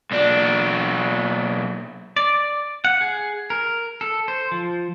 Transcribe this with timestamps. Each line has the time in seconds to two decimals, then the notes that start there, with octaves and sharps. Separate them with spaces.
0.11 B1 D4
2.17 D5
2.85 F#5
3.01 G#4
3.50 A#4
4.01 A4
4.28 C5
4.52 F3